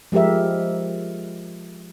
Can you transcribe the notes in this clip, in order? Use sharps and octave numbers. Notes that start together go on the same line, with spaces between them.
F3 G#3 G4 A#4 E5